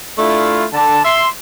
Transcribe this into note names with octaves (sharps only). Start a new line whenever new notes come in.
A3 D4 E4 F4
D3 A5
E5 C6